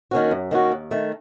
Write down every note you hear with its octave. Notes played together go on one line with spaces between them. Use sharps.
D#3 A#3 C#4 F#4
F#2
D#3 A#3 C#4 F#4
D#2
D#3 A3